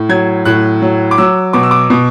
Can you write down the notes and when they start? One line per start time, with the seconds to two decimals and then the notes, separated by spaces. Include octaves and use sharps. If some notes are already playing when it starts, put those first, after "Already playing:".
Already playing: A2
0.09 F#3 G#6
0.45 A2 F#6
0.82 F#3
1.11 D6
1.18 F#3 E6
1.53 B2 D6
1.63 E6
1.71 D6
1.90 B2